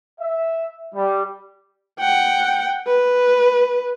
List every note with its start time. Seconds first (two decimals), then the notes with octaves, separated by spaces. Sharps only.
0.20 E5
0.95 G3
2.00 F#5 G5
2.88 B4